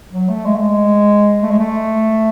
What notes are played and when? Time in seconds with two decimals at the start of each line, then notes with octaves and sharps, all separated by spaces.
0.12 F#3
0.29 A3
0.45 G#3
0.55 A3
0.62 G#3
1.42 A3
1.51 G#3
1.59 A3